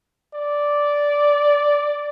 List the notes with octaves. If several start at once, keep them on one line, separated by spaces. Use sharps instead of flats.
D5